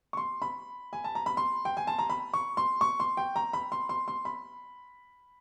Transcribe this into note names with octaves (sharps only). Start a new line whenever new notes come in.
C#6
C6
B5
G#5
A5
A#5
B5
C6
G5
G#5
A5
A#5
B5
C#6
C6
C#6
C6
G5
A#5
B5
C6
C6
C6
B5